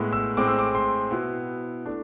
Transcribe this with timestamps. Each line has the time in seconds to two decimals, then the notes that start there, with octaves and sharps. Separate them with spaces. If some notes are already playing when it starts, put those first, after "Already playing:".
Already playing: A2 G#3 B3 E4
0.13 E6
0.37 A2 G#3 C4 D6
0.48 E6
0.59 D6
0.75 C6
1.11 B2 B3 E4
1.86 A3 D4